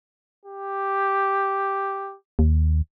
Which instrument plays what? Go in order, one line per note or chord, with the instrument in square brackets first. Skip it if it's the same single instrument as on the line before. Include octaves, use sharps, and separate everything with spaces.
[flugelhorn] G4
[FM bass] D#2